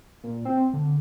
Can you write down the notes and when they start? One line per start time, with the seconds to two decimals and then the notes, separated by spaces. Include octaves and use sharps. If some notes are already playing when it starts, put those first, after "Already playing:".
0.24 A#2
0.45 C4
0.74 D3